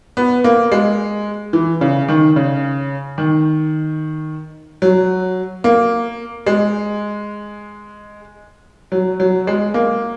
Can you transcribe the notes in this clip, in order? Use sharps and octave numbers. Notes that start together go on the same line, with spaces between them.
B3
A#3
G#3
E3
C#3
D#3
C#3
D#3
F#3
A#3
G#3
F#3
F#3
G#3
A#3